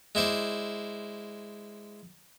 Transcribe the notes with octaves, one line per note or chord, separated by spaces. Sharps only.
G#3 E4 C5 D5